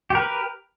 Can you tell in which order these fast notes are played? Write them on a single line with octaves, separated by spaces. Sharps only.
G4 A#4 B4